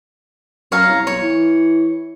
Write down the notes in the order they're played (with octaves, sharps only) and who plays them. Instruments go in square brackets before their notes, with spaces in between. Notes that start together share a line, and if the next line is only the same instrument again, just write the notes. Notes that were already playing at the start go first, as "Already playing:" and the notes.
[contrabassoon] F#2 [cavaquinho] C#5 F5 A#5
[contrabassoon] C2
[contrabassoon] B1 [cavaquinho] C#5
[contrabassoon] E3